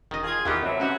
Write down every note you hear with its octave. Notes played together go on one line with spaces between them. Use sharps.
E1 D#3 D#5
F4 G#4
D#2 D#3 E3 B3 F4 G4
C3 F3 F#3 B4 E5
G#2 F#3 C#4 F#4 G4